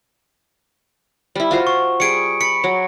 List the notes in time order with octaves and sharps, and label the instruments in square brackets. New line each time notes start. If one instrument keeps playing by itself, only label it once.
[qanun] G3 E4
F4 F#4 C5
[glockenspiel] C#6
[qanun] G3 G#4 [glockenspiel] C#7 D7
[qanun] B5 [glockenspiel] C#7
[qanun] F#3